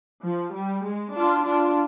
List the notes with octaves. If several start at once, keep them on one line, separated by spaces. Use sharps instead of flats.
F3
G3
G#3
D4 F4
D4 F4